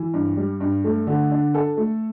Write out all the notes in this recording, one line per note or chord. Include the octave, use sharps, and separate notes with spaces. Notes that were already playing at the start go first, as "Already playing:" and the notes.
Already playing: E3
G2
G3
G2
A3
D3
D4
A4
A3